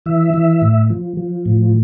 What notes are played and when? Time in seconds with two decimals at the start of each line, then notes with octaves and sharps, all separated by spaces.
0.06 E3 E5
0.34 E3
0.62 A2
0.90 F3
1.17 F3
1.46 A2